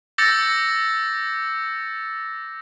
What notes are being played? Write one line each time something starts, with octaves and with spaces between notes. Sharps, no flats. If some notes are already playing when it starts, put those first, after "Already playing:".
D6 E6 G6 A6 A#6 C#7